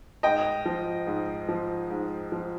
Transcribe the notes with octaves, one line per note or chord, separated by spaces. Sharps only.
G#2 D#5 G5
F3
G#2
F3
G#2
F3